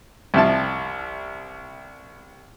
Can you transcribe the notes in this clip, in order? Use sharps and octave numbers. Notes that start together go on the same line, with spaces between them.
C2 C3 F3 E4 A5